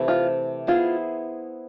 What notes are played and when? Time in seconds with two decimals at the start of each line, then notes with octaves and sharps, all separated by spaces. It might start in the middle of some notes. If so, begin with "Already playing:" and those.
Already playing: C3 E3 A3
0.08 F4
0.67 B3 E4 F4 G#4 C5